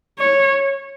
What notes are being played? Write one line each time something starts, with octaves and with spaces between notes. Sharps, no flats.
C#5